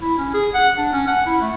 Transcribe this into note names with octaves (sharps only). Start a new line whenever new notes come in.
E4
C#4
G#4
F#5
D4
C#4
F#5
E4
A3